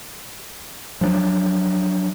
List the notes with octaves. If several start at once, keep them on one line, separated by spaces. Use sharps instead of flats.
F3 F#3 B3 D4